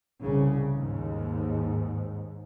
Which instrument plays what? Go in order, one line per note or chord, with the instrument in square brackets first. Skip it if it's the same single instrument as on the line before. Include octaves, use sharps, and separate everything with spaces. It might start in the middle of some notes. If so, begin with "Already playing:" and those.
[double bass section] C2 C#3
D#2 G#2